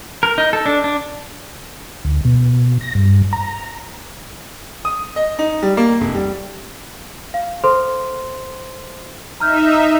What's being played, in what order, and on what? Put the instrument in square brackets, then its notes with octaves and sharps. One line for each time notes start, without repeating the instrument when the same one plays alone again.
[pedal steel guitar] A#4
D#4
A4
D4
D4
[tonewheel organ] D2
B2
A#6
G2
A#5
[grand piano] D#6
D#5
D#4
G3
A#3
F1
G3
[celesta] F5
A4 C5 C6
[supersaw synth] D#4 E5 [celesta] A#5 F6 G6